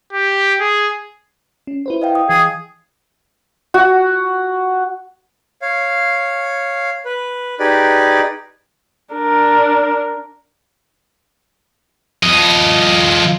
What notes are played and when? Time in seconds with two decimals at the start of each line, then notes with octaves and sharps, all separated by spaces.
0.13 G4
0.60 G#4
1.67 C#4
1.86 E4 B4 C5
2.02 D#5 F5 G5
2.15 D#6
2.29 E3 G#4
3.74 F#4
5.62 C#5 F5
7.05 B4
7.60 D#4 G4 G#4 B4 D5
9.14 D4 A#4
12.23 F3 D#5